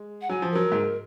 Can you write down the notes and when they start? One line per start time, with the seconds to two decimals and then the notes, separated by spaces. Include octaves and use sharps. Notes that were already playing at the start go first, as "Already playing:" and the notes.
Already playing: G#3
0.21 F#5
0.29 F#3 G#5
0.42 F3
0.50 A#4
0.55 F#3
0.72 G#2